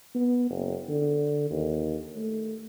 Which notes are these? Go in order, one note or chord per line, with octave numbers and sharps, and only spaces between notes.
B3
F#1
D3
D#2
A3